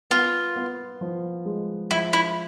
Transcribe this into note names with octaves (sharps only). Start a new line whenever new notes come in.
B3 F4
B3
F3
G#3
F3 E4
E4